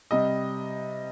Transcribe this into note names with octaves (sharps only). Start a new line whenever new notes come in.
C3 G3 D#5